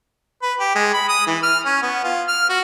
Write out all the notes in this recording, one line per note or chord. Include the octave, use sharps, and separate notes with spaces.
B4
G4
G#3
B5
D#6
E3
F6
C#4
B3
F4
F6
F#4